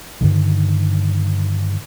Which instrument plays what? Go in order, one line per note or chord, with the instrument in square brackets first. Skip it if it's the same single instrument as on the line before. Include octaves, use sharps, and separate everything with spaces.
[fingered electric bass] G2 D3 D#3